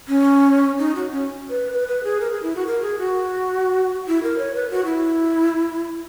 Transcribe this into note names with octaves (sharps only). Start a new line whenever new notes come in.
C#4
D#4
F#4
C#4
B4
B4
B4
G#4
A#4
G#4
E4
F#4
A#4
G#4
F#4
E4
A#4
C#5
B4
F#4
E4